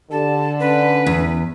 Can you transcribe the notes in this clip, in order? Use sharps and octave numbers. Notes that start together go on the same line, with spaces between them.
D3 G4 A5
C#4 B4
E2